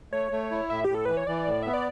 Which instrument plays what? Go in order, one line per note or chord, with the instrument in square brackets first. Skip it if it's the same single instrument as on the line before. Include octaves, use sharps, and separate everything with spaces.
[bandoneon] A3 [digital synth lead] C#5
[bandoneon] A3
E4
[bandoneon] A2 [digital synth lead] E5
[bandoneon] A2 [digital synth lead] G4
[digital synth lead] A4
[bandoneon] E3 [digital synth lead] B4
[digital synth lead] C#5
[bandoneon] E3 [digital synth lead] D5
[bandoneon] A2
[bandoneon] B3 [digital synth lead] E5
[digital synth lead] D5